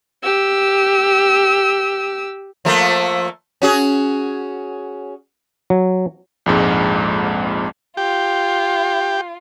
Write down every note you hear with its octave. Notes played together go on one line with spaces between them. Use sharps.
G4 E6
F3 A3 A#3
C#4 F#4 G#4
F#3
A#1 F2 G#2 G#3
F4 G4